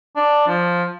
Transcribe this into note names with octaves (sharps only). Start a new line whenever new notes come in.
D4
F3